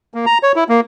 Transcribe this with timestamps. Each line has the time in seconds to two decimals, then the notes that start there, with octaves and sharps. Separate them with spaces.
0.14 A#3
0.26 A#5
0.43 C#5
0.56 E4
0.69 A#3